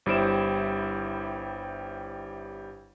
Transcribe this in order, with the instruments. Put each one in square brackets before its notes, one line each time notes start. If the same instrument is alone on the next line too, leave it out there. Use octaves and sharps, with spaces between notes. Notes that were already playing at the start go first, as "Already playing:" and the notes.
[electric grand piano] G1 G3 E4 C5 D7 E7